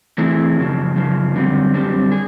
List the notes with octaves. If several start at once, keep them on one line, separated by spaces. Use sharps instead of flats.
E3 A3 C4 E4 G#4
F#2 C#3 F3
F#2 C#3 F3
F#2 D3 G3 C4
F#2 D3 G3 C4
G#4